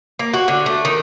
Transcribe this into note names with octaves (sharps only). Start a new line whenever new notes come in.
A#3
F#4
D3
A3
D#3